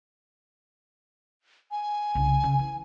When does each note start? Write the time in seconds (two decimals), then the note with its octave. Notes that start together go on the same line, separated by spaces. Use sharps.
1.71 G#5
2.15 C2 C#3
2.43 C#3
2.59 E3